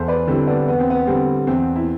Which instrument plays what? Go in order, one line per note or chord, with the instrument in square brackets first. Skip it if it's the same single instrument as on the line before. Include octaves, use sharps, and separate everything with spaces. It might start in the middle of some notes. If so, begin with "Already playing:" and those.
Already playing: [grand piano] E2 [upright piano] A4 C5
[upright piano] B4 D5
[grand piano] D3 G3 [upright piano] C4 E4
[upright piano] B3 D4
[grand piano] E2 [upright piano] B3
[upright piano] C4
B3
[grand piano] D3 G3 [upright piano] C4
[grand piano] E2 [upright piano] C4
[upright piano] E4